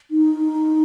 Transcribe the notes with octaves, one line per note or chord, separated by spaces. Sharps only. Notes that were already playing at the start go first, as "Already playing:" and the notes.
D#4